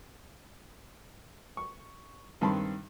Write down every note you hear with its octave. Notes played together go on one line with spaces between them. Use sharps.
C#6
G2 D#3 C4 A5 B5 C6